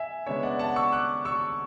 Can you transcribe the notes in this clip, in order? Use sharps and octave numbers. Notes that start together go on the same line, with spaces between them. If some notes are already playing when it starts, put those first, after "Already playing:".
Already playing: E5 G#5
C#3 G#3 B3 D4 C#5 E5
D5 F#5
F#5 A5
C#6 E6
D6 F#6
C#6 E6